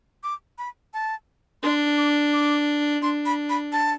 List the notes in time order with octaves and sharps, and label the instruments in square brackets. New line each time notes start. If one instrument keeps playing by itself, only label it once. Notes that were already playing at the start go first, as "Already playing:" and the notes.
[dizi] D6
B5
A5
[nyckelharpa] D4 [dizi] C6
[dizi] D6
D6
[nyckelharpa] D4 [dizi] C6
[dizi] B5
B5
A5